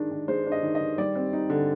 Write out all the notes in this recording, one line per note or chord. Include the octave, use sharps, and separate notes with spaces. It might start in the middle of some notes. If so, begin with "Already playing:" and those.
Already playing: D#3 G#3 D4
D#3
G#3 C5
D4
D#5
D#3
D#5
D#3
G3 D5
C4
D#4
D3